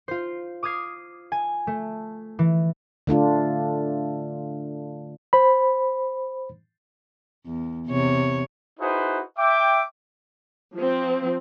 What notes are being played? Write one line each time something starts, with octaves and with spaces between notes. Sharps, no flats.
F4 C5
D6 D#6 F6 G#6 C7
G#5
A3
E3
D3 A3 D4 F4
C5 B5
E2
E2 C3 C#5
D#4 E4 F#4 G#4 B4 C5
E5 G5 D6
F3 C4